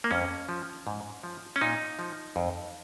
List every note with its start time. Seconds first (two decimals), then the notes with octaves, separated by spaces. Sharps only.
0.04 A#3
0.11 F2 C#4
0.49 F3
0.87 G#2
1.23 F3
1.56 C#4
1.61 A#2 D#4
1.99 F3
2.36 F2